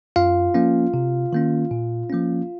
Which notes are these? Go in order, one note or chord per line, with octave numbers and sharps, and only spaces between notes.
F#2 F4 F5
F3 A#3 C#4
C3
D#3 A#3 C#4
A#2
F3 A#3 C#4